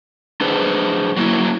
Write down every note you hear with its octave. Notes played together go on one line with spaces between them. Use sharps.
D4 G#4 B4 C5
F#3 A#3 E4